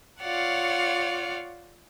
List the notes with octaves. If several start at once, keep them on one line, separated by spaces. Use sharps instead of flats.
F4 C#5 D5 F5 F#5